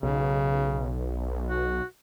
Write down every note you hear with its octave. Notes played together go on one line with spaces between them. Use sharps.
B1 C#3
F#4